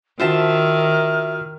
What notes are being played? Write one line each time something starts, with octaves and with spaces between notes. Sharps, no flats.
D#3 F4 F#4 C5 E5 A5 F6